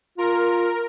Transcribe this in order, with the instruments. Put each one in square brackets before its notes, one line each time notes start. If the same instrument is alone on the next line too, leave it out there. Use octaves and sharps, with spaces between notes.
[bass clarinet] F4 [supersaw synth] A#4